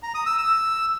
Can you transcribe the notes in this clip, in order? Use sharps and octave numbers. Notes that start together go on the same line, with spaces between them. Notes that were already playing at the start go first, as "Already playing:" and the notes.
A#5
D#6
E6
E6